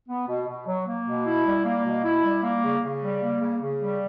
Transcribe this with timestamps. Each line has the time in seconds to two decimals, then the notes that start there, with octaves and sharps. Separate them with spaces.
0.09 B3
0.28 B2
0.48 B2
0.67 F#3
0.86 A#3
1.06 B2
1.26 E4
1.45 G3
1.65 A#3
1.84 B2
2.04 E4
2.23 G3
2.43 A#3
2.62 C#3
2.82 C#3
3.02 G3
3.21 A#3
3.40 C#3
3.60 C#3
3.80 G3